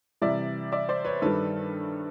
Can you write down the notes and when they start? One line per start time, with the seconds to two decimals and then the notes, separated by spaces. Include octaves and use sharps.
0.22 C3 E3 G3 D5 E5
0.72 D5 E5
0.89 C5 D5
1.05 B4 C#5
1.22 G2 D#3 G3 A4 B4